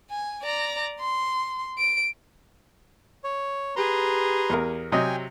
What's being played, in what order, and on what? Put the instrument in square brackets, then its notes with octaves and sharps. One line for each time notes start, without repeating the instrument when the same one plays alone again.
[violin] G#5
D5 A#5
C6
D7
[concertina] C#5
[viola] G4 G#4 [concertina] B4 A#5 C6
[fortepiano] E2 A#4
[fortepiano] C3 F#3 D#5 [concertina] G5 G#5